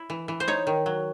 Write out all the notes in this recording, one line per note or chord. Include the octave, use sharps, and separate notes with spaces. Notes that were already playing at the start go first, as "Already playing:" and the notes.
Already playing: E4
E3
E3
C5
D#4 C#5
D#3
F#3